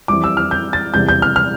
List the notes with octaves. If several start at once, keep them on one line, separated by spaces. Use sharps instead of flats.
F2 E3 G3 D6
E6
F6
G6
A6
E2 C3 G3 G6
G6
F6
F6